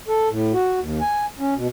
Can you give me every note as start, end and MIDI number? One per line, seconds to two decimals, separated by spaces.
0.08 0.29 69
0.29 0.53 45
0.53 0.80 66
0.80 1.00 39
1.01 1.26 80
1.39 1.54 61
1.56 1.67 47